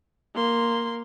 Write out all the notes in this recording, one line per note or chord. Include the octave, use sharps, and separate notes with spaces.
A#3 C6